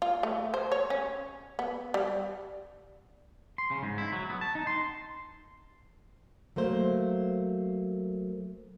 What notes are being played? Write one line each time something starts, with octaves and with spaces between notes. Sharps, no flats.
F4
A3
C5
C#5
C#4
B3
G3
C6
C#3
G#2
E4
F#3
B3
A5
D#4
C6
F#3 A3 A#3 C5